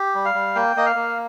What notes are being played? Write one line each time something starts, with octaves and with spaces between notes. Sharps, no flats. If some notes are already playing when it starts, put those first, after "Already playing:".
Already playing: G4
G3
F5
G3
A#3 G5
A#3 D#5
F5
A#3